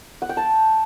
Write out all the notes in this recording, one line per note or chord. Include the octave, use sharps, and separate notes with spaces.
F#5
G5
A5